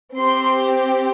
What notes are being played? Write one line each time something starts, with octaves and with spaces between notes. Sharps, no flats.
C4 G4 C6